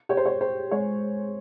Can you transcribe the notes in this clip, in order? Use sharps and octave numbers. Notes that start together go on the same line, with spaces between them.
G4 C#5
C5
C#5
G4 C5
G#3 C#5